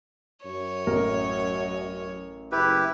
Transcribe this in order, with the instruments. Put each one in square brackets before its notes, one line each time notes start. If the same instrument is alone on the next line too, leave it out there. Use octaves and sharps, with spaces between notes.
[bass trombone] F#2 [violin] C#5
[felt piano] A1 A#4
[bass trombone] F#1 [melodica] E4 G4 B4